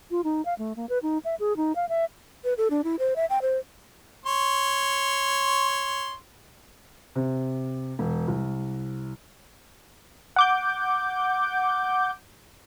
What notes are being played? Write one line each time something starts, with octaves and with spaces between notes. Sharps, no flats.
F4
D#4
F5
A3
A#3
B4
D#4
E5
G#4
D#4
F5
E5
B4
A4
D4
E4
C5
E5
G5
C5
C#5 C6
C3
E1
C2
F#5 D6 G6